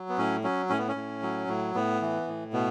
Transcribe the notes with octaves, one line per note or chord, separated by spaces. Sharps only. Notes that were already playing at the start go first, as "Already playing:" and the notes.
Already playing: F#3
B3
A2 C#4
F#3 C#4
A2 C#4
B3
C#4
A2
F#3
A2
A2 B3
E3
A2
B2 B3